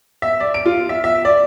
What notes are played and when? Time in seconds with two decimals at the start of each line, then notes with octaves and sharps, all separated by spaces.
0.22 E5
0.40 D5
0.54 D7
0.66 F4
0.89 E5
1.04 E5
1.25 D5